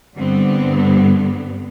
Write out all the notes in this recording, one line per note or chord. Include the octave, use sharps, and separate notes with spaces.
G2 D3 G3 B3 C4